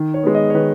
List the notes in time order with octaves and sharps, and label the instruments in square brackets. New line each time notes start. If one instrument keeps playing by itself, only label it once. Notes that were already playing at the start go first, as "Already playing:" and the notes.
Already playing: [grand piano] D#3
C#5
G#3 B3
D#5
C#5
D#3 B4